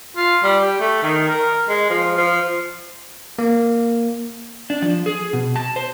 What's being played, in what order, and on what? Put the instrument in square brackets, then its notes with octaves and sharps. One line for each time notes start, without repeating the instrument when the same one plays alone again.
[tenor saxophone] F4
G3
G4
A3
D#3
A#4
G#3
F3
F3
[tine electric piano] A#3
[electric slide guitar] D4
F3
G#4
B2
A5
C5